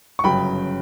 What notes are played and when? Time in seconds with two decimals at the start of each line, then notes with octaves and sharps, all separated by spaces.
0.19 C#6
0.24 G1 F#2 C#3 F#3 G5 B5